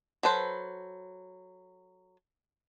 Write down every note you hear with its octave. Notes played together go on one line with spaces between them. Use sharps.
F#3 A4 B4 C5